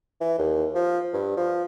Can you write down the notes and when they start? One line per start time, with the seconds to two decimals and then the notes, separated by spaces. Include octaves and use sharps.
0.21 E3
0.38 D#2
0.75 F3
1.13 G2
1.37 F3